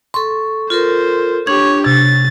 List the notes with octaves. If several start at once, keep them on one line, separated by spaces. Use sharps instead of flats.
A4 C6 C#6
F4 A4 A#4 C5
D4 G4 C#5 G#6
C3 A6